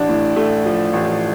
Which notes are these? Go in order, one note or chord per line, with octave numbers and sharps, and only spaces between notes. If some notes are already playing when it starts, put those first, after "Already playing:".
Already playing: A1 D4
A2
A3
F3
A1